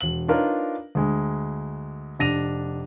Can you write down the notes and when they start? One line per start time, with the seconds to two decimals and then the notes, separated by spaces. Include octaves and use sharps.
0.01 E1 F#7
0.28 D4 D#4 F4 A#4 B4 C#5
0.95 D2 G#3
2.19 F1 D4 A#6 D#7 F7